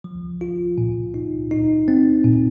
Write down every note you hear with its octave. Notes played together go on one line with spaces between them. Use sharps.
F3
F4
A#2
D#4
D#4
C4
A#2